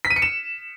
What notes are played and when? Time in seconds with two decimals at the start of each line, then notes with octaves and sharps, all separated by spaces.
0.05 B6
0.10 D#7
0.16 C#7
0.22 E7